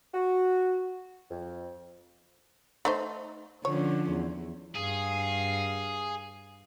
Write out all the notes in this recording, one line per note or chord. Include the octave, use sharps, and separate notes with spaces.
F#4
F2
A3 D#4 C5
D3 F3 C#4 C#5
E2
G2 G#4 F5